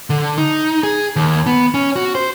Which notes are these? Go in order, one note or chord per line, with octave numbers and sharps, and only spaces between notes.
D3
D#4
G#4
D#2
B3
C#4
F#4
C5